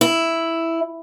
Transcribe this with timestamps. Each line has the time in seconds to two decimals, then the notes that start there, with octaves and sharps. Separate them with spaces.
0.01 E4